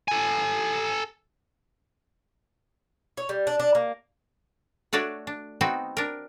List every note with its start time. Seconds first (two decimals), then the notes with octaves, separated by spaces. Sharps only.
0.08 A4 G#5
3.17 C#5
3.29 G3
3.47 D4
3.60 D4
3.75 A#3
4.93 A3 D4 F#4 C#5 D5
5.27 D4
5.61 B3 C4 D#4 F#4
5.97 D4 A#4